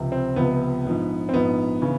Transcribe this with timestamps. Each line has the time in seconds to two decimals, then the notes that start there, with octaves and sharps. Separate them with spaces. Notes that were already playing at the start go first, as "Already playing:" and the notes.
Already playing: C#2 C3 F3
0.12 C4
0.36 C#2 C3 F3 B3
0.85 A#1 G#2 F3
1.29 C4
1.34 A#1 G#2 F3 B3
1.82 C#3 E3